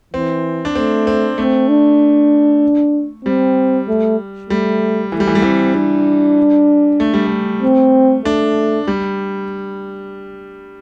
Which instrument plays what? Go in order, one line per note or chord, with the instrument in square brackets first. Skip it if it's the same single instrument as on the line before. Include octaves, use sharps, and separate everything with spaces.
[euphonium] E3 [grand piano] C4
[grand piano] D4
[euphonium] A3 [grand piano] C4
[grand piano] C4
[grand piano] A3 [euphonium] C4
[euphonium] D4
[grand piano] G3 [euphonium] C4
[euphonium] A3
[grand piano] G3 [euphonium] A3
[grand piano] E3 [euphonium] A3
[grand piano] G3
E3
G3
[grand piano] E3 [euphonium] C4
[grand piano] G3 [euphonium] D4
[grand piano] A3
G3
A3
[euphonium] C4
[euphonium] A3 [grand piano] D4
[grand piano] G3